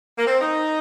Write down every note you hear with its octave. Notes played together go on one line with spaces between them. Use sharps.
A#3
C4
D#4